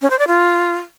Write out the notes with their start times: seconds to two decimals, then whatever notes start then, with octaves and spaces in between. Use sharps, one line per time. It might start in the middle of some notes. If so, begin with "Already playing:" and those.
0.02 C#4
0.10 C5
0.19 D5
0.27 F4